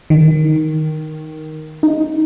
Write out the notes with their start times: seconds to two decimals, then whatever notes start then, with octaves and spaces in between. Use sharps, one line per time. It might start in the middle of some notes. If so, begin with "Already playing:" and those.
0.10 D#3
1.83 D#4